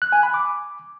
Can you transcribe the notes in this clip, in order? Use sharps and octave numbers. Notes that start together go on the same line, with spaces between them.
F#6
G#5
B5
D6